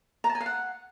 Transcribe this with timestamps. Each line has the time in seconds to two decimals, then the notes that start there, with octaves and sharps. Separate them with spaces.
0.24 A#5
0.29 A5
0.35 G#5
0.40 F5
0.46 F#5